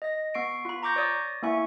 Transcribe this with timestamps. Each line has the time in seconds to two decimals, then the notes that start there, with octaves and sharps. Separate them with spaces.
0.02 D#5 A#6
0.34 B3 C#6 C7 D7
0.65 F4 B5
0.83 A#5 C#6 D6 G6 A#6
0.96 C#5 D5 D#6 A#6
1.42 A#3 B3 E4 E5 G#5 C#6